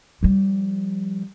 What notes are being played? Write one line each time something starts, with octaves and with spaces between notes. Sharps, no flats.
F3 G3